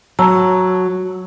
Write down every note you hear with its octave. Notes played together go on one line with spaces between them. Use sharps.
F#3 A5 A#5 E6